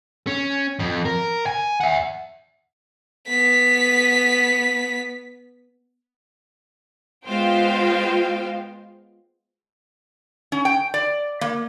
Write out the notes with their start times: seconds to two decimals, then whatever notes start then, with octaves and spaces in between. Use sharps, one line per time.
0.27 C#4
0.79 F2
1.05 A#4
1.46 G#5
1.81 E5 F#5
3.28 B3 B6
7.28 G#3 B3 F4 C5 F5 G5
10.52 C#4
10.65 G5
10.94 D5
11.41 A#3